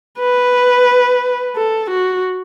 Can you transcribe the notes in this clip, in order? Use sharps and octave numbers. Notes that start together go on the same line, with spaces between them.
B4
A4
F#4